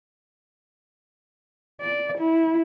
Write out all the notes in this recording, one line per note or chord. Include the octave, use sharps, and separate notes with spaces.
D5
E4